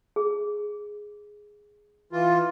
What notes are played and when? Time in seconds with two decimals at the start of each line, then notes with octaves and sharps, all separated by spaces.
0.16 G#4
2.13 E3 F4